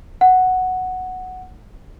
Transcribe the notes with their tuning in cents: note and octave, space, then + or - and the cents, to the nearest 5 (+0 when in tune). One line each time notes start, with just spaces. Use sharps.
F#5 +0